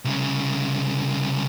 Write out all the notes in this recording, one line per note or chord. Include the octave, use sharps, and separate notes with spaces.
C2 C#3